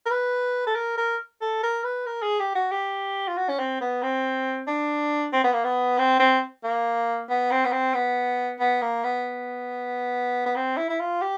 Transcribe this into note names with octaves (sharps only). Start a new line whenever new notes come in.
A#4
B4
A4
A#4
A#4
A4
A#4
B4
A#4
G#4
G4
F#4
G4
F4
F#4
C#4
C4
B3
C4
D4
C4
B3
A#3
B3
C4
C4
A#3
B3
C4
B3
C4
B3
B3
A#3
B3
B3
C4
E4
E4
F4
G4